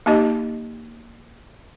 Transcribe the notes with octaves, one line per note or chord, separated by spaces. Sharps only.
A#3 D#4 G4 D#5